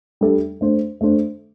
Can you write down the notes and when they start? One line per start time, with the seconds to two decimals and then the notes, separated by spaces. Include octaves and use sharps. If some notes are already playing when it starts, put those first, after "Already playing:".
0.21 G3 D4 A4 E5
0.61 A3 D4 C5
1.01 A3 D4 C5